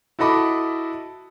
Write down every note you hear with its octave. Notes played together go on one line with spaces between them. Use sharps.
E4 F#4 A4 D#5 B5 D6